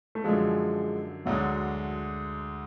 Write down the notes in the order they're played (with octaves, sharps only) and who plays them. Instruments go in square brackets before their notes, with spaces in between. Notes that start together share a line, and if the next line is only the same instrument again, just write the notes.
[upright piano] A3
[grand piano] F#2 D3 F#3 [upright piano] F3 G#3
[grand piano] D2 D3 G#3 [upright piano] F#3